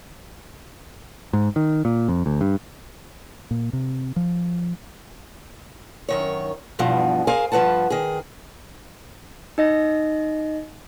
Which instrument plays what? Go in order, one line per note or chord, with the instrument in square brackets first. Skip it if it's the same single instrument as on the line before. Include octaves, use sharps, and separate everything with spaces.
[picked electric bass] G#2
D#3
A#2
F2
D2
G2
[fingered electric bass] A#2
C3
F3
[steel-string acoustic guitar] F#2 D#3 C#5
E2 G2 B2 F3
G#4 A#4 C5 F5 G#5
G2 F3 G#3 B4 F#5 A5
D#3 G#4
[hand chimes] D#4 D#5 A#6